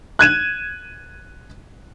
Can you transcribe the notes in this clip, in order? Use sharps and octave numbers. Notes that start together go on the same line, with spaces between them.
F#6 G#6 D#7 E7